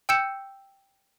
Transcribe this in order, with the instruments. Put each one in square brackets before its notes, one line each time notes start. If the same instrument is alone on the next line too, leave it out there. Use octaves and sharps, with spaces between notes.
[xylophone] G5 E6 G6 C#7 E7